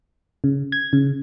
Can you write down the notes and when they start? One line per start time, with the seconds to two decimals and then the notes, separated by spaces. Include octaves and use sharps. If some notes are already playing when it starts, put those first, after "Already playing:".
0.44 C#3
0.72 G#6
0.93 C#3